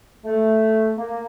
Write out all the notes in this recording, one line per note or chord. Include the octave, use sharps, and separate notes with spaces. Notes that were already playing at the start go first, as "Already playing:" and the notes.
A3
A#3